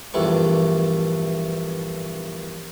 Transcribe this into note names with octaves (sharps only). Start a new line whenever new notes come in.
A#1 E2 G2 A3 C#6